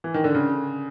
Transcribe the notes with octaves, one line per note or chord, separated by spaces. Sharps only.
E3
D#3
D3
C#3